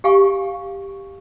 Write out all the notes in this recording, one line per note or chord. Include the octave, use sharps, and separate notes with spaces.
G4 F5 G#5 C#6